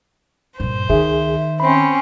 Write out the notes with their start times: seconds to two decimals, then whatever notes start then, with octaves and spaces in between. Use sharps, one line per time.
0.60 G2 A#2 C5
0.90 C#2 D#3 G#4 E5
1.60 C4 C#4 B5